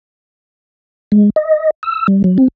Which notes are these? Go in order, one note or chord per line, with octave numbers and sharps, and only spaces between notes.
G#3
D#5
E6
G3
F#3
C4